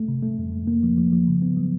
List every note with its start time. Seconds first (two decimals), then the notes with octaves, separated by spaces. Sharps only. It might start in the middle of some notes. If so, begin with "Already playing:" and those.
Already playing: A3
0.08 C3
0.23 A3
0.38 F2
0.52 F2
0.67 A#3
0.83 F3
0.97 F3
1.12 F3
1.27 C#3
1.42 B3
1.57 F#3